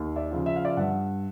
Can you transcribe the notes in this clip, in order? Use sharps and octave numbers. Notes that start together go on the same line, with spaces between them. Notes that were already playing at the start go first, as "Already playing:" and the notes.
Already playing: D#2
D5 E5
C#3 F3
E5
F5
D5 E5
G2 E5 F#5